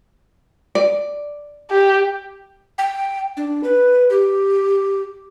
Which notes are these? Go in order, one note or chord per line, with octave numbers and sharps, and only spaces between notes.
D5
G4
G5
D4
B4
G4